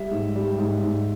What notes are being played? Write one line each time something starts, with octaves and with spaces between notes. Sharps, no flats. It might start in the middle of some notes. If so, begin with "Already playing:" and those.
Already playing: G3 E5
G#2
G3
G#2
G#2